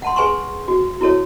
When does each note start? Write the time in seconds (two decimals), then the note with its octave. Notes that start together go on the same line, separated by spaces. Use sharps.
0.02 F#5 A5 C6
0.16 G#4 B4 G#5 C6 C#6
0.68 F#4
1.01 E4 F#4 A4 C#5